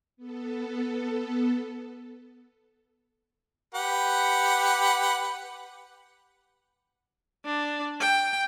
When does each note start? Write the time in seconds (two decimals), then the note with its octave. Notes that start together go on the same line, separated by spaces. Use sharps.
0.17 B3 A4
3.74 G4 B4 F#5
7.45 D4
8.00 G5